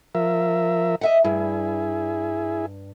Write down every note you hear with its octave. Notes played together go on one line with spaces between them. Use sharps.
F3 A#4 E5
D#5 E5 F#5
G2 E4 G#4